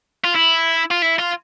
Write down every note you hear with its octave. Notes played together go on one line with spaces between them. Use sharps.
F4
E4
F4
E4
F4